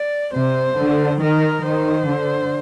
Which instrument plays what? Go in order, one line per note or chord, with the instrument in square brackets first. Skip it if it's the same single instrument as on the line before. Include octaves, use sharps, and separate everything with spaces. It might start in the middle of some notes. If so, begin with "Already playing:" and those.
Already playing: [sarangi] D5
[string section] C3 [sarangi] C5
[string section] D3
[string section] D#3 [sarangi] A#4
[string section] D#3 [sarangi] C5
[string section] D3